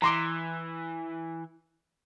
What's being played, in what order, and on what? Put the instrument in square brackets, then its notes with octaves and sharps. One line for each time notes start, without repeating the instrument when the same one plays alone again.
[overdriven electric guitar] E3 [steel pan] A#5 C6 D6